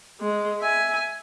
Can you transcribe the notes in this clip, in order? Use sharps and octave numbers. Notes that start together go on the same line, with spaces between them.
G#3
E5 G#5